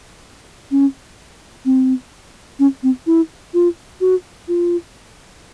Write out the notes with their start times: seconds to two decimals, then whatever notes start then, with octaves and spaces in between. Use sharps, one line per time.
0.71 C#4
1.65 C4
2.59 C#4
2.83 C4
3.07 E4
3.54 F4
4.01 F#4
4.48 F4